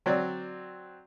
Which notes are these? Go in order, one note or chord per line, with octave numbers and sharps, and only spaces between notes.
F#3 C4 D5